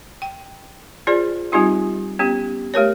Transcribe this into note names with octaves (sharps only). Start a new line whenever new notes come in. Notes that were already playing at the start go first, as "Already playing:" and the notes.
G5
F4 G#4 C5 D5
G3 C4 D#4 F4 G4
B3 C#4 G4
A3 G4 A#4 C#5